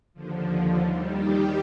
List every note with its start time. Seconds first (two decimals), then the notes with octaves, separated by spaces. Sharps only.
0.14 D#2 D3 F3
0.81 D#2 D#3 G3
1.15 G4